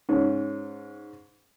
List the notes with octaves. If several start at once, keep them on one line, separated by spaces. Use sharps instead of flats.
G#2 C#4